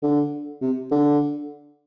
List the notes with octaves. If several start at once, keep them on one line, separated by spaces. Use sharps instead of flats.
D3
C3
D3